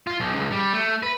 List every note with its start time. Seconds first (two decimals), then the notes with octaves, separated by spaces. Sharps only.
0.07 F4
0.20 B1
0.35 C#2
0.52 G3
0.73 A3
1.03 B4